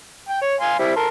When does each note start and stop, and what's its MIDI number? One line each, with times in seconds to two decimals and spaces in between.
0.29 0.41 79
0.42 0.54 73
0.61 0.78 77
0.61 0.78 80
0.61 0.78 84
0.79 0.93 55
0.79 0.93 60
0.79 0.93 64
0.96 1.08 69
0.96 1.08 70
0.96 1.08 84